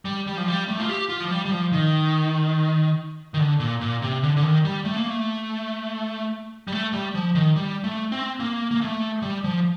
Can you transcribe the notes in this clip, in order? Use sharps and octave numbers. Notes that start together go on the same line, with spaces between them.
G3
G3
F3
G3
A3
F4
G4
F4
F3
G3
G3
F3
D#3
D#3
D3
A#2
A#2
C3
D3
D3
D#3
G3
A3
A#3
A3
G3
A3
G3
F3
D#3
G3
A3
C4
A#3
A#3
A3
G3
F3